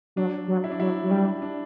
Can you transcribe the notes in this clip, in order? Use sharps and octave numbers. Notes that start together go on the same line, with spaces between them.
F#3 D4
F#3
E4
D4
F#3 E4
F#3
G3 D4
D4